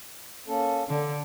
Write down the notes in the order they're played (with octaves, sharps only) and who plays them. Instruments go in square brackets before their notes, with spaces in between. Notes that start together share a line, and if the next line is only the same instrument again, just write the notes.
[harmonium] A#3 C#4 A4
[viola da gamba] D3 [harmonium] A4